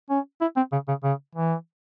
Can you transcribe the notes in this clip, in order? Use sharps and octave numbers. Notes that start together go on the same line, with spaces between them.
C#4
E4
C4
C#3
C#3
C#3
E3